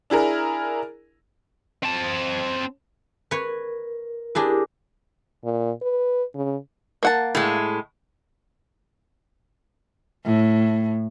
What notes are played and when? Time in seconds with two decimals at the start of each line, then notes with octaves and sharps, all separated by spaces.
0.10 D4 E4 G#4 A#4
1.83 C4 A5
3.31 A#4 B4 C#5
4.35 D4 E4 G4 G#4 A#4 B4
5.44 A#2
5.82 B4
6.35 C#3
7.03 A#3 F#5 A5
7.35 A2 G#3
10.26 A2